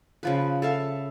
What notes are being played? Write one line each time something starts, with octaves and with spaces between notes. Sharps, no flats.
C#3 F3 B4
A4 E5 F5